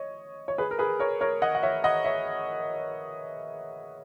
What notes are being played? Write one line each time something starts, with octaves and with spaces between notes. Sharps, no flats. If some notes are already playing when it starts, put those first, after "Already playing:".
Already playing: C#5 D#5
C#5
G#4 B4
A#4
G#4 B4
A#4 C#5
A#4 C#5
D#5 F#5
F#5
C#5 E5
D#5 F#5
C#5 E5